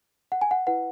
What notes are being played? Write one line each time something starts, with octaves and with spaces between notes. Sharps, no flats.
F#5
G#5
F#5
E4 B4 F#5